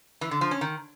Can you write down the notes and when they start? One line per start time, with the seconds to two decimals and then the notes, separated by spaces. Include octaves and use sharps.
0.21 E3
0.31 D3
0.41 F3
0.51 C#4
0.61 D#3